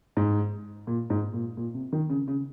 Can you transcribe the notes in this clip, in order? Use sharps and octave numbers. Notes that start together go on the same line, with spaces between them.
G#2
A#2
G#2
A#2
A#2
C3
D#3
C#3
C#3